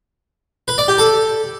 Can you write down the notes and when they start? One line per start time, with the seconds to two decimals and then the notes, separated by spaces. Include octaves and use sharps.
0.68 B4
0.78 D5
0.88 G4
0.98 A4